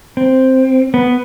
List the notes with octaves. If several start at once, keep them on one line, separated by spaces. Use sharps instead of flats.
C4
B3